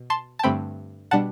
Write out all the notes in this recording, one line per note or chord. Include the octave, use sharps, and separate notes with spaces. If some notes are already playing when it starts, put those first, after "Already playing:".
Already playing: B2
A5 C6
A5
G2 D3 A3 C4 G5 B5
B2 G3 D4 F#5 A5